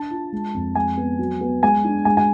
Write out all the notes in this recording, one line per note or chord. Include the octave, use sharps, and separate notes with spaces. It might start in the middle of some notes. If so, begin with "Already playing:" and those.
Already playing: D4 A5
F4
G#3
F2
G#3 G#5
B3
F#3
B3
G#3 G#5
D4
G#3 G#5
G#5